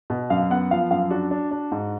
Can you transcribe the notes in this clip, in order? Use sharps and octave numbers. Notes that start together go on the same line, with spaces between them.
B2
F#2 F5
B3 F#5
F3 F5
F#2 F5
D4 F#4
D4
D4
G#2